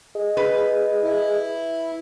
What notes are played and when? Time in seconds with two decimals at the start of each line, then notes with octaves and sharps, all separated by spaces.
0.15 G#4 D#5
0.37 B4
1.03 E4